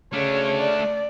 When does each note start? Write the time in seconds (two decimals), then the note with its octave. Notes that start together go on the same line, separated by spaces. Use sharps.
0.13 C#3 A3 D4 C#5
0.60 D5